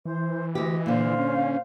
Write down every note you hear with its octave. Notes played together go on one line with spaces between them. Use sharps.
E3 C5
D2 G4 D#5
A#2 D3 C5 F5
C#4